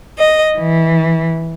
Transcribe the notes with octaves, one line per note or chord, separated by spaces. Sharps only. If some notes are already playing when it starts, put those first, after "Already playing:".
D#5
E3